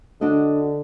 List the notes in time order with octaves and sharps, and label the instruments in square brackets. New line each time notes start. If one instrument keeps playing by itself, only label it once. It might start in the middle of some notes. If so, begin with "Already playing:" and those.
[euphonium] D3 [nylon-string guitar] D4 F#4 D#5